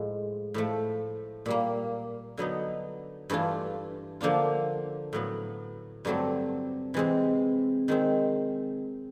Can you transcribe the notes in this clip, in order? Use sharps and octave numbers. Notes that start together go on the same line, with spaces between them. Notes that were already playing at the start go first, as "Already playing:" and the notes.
Already playing: A2 F3 G#3
A2 F3 A3
A#2 G3 A#3
D3 F#3 B3 D#4
G2 E3 A3 D4 F4
D3 F3 A#3 D4 F4
A2 F#3 B3
G2 D3 F#3 A3 C4
C3 E3 G#3 C4
D#3 G#3 C4